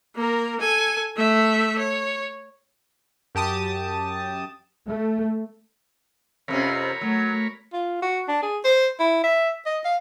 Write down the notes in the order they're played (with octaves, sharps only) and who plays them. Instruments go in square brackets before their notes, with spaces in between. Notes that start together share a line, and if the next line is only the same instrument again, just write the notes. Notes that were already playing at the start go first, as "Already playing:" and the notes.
[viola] A#3 A#4
A4 G#5
A3 E5
C#5
[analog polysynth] F#2 G4 A5 D#6
[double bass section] A3
[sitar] F2 C3 C#4 [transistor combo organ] A#4 C#5 B5
[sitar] F#3 [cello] A3
[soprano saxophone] F4
F#4
D4
G#4
C5
E4
E5
D#5
F5